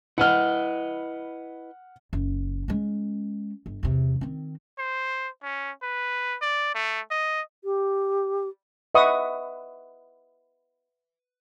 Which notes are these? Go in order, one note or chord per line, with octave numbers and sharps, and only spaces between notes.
E4 B4 D#5 F#5 F6
F#1
G#3 C#4
G1
E2 C3
D#3 C4
C5
C#4
B4
D5
A3
D#5
G4
B4 D#5 E5 F#5 C#6 D#6